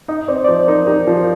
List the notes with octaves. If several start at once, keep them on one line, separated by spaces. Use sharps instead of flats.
D#4 D#5
C4 D5
D5
F3 C5
D#4 A#4
D#4 G4
F3 F4